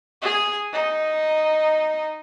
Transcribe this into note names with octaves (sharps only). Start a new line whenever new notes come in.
G#4
D#4